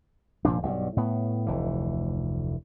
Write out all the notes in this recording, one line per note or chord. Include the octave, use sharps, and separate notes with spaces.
F1 A#2 F3 D4
B1 G2
A2 B3
F1 D2 E3